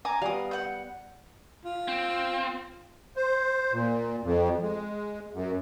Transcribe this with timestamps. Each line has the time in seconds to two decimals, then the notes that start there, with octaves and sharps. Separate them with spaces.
0.05 G#5 A#5 D6
0.22 G3 B3 F5 D#6
0.51 F#5 G6
1.65 F4
1.88 C4
3.16 C5
3.73 A#2
4.23 F2
4.63 G#3
5.34 F#2